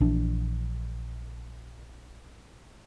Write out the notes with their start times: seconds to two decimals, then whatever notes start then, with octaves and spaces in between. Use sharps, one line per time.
0.01 A#1 E3 D4